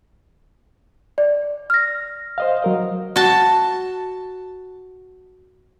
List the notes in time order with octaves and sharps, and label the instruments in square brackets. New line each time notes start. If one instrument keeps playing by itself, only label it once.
[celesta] D5
F6 A#6
[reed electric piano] C5 D#5 F5
F#3 A#4 D#5
[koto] F#4 A5